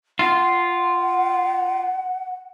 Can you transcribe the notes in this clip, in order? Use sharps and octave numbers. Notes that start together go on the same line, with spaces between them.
F4 F#5